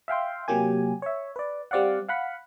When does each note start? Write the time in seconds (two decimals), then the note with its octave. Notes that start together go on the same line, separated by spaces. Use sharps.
0.08 E5 F5 G5 C6
0.48 C3 F#3 A#3 G4 G#5
1.02 C#5 E5
1.36 B4 D5
1.71 G3 C4 D5 F5 F#5
2.09 F5 F#5 B5